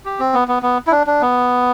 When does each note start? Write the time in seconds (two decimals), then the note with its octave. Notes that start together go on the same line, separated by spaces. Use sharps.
0.05 G4
0.20 C4
0.34 B3
0.48 B3
0.63 B3
0.87 E4
0.92 D4
1.07 D4
1.22 B3